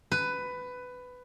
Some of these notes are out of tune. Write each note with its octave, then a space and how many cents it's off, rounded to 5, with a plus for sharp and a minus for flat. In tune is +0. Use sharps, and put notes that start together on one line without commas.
B4 +15